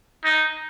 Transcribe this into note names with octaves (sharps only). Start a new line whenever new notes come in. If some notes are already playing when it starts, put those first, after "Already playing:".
D#4